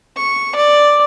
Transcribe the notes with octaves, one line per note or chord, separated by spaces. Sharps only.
C#6
D5